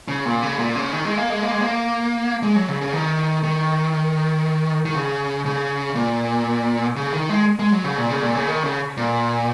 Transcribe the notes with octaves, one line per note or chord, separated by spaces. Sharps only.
C#3
A#2
C#3
A#2
C#3
D#3
G#3
A#3
G#3
A#3
G#3
A#3
G#3
F#3
C#3
C#3
D#3
D#3
D#3
C#3
C#3
A#2
C#3
D#3
G#3
G#3
F#3
C#3
A#2
C#3
A#2
C#3
D#3
C#3
A#2